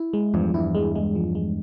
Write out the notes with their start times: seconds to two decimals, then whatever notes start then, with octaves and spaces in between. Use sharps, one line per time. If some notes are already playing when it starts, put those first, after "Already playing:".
Already playing: E4
0.13 G#3
0.34 E2 G2 F3
0.54 E2 G2 E4
0.75 G#3
0.95 G#3
1.15 F3
1.35 G#3